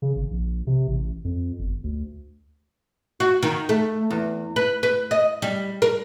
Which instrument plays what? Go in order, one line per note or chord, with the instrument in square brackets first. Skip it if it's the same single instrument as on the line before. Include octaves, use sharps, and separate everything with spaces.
[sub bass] C#3
G#1
A#1
C3
A1
F2
G1
D2
[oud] F#4
D#3
A3
E2
B4
B4
D#5
G3
A#4